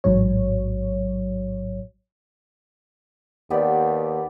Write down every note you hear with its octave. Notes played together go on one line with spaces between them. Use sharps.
A1 G#2 F#3 C#5
D#2 B3 G4 D5